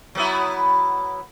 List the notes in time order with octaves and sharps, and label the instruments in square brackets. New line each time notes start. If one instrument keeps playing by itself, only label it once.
[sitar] F#3 B3 E4